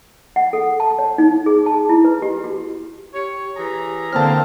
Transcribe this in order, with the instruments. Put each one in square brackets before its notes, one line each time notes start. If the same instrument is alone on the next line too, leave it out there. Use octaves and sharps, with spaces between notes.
[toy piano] F#5
A4
A5
C#5
D#4
G#4
A5
E4
B4
G4
F#4
[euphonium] G4 [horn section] C#5
[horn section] E3 G#4 A#5 [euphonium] G4
[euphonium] A#2 [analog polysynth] D3 A#3 C4 [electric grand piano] A5 F6